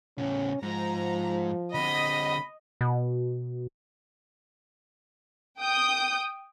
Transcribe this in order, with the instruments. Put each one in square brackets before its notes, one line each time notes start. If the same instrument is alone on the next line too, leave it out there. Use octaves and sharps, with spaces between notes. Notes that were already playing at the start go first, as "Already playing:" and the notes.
[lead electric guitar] A2 C#3 [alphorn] C#4
[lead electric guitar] G#2 [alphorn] F3 [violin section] A#5
[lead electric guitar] D3 C4 [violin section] D#5 [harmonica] B5
[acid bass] B2
[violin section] G5 D#6 G6